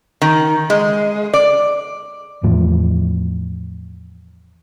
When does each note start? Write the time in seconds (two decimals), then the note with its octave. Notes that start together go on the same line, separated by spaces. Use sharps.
0.22 D#3
0.70 G#3
1.34 D5
2.43 E2 A2 F3